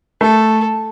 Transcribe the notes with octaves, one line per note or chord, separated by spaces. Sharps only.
A3 A4